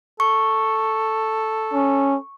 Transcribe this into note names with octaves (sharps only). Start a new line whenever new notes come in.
A4 C#6
C#4